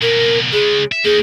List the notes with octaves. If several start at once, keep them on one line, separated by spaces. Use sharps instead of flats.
B2 A#3 A#4
C#3 G#3 G#4
E5
A#3 D#4 G#4